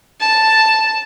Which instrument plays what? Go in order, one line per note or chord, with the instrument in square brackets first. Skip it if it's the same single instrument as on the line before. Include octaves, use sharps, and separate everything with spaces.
[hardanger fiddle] A5